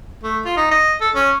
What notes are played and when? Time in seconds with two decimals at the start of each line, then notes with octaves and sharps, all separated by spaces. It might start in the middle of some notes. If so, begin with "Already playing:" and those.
0.23 A3
0.45 F4
0.57 D#4
0.71 D#5
1.01 A4
1.15 C#4